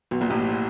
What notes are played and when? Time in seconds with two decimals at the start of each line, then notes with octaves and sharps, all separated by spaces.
0.11 B1 B2
0.21 A#1 A#2
0.30 A1 A2